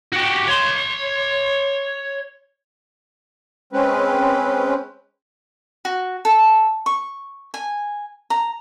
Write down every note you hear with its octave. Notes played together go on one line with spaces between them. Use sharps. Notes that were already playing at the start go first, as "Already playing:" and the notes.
F#4 G4
C#5 C6
G#3 C4 C#4 B4
F#4
A4
C#6
G#5
A#5